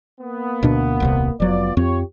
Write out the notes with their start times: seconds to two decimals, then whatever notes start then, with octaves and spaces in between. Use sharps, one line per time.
0.21 A#3 B3
0.63 D2 B2 D4
1.00 D#1 C2 C3
1.40 F1 F#3 B3 F4 D5
1.77 F2 C4 F4 G4 C#5